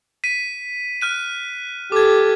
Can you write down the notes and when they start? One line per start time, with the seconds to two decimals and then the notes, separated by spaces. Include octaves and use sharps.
0.24 B6 D#7
1.01 F6 F#6 D#7
1.92 G4 A4 D6 G#6